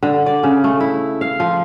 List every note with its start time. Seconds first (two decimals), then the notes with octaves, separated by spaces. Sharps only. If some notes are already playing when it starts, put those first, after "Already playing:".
0.03 D3
0.26 D5
0.43 C#3
0.64 A3
0.80 E4
1.21 F5
1.40 F3